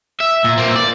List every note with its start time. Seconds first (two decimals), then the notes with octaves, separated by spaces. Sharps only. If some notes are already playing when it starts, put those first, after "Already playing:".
0.21 E5
0.44 A#2
0.57 A#3 C4
0.75 D5